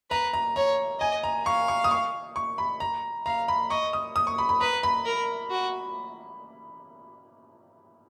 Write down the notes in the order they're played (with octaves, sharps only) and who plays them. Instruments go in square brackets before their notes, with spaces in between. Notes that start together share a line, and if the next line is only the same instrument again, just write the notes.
[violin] B4 [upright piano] A#5
[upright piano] A#5
[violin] C#5 [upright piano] A#5
[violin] D#5 [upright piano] G#5
[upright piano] A#5
[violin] F5 [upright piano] C#6
[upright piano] C#6
D#6
C#6
C#6
B5
A#5
[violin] F5 [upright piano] A#5
[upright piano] B5
[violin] D#5 [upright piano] C#6
[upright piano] D#6
D#6
C#6
B5
B5
[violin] B4 [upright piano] A#5
[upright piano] B5
[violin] A#4
F#4